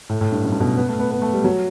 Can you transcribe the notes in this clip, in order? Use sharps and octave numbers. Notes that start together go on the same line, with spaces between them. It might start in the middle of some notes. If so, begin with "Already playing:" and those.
A2
A2
G2
F#2
G2
B2
B3
A3
B3
B3
A3
G3
F#3